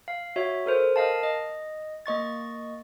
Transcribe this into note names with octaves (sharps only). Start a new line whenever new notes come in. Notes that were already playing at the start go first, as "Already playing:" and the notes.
F5
F#4 C#5 E5
A4 A#4 C5
A#4 D#5 F5 A5
D#5
A#3 D#5 C#6 A6